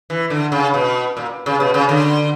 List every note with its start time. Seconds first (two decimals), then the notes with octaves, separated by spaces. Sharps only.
0.10 E3
0.30 D3
0.52 C#3
0.74 B2
1.17 A#2
1.46 C#3
1.60 B2
1.74 C#3
1.89 D3